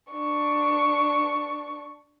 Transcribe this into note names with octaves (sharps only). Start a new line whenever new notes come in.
D4 C#6